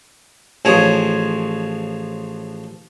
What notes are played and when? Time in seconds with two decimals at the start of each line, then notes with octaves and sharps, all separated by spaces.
0.65 A1 F3 G#4 C#5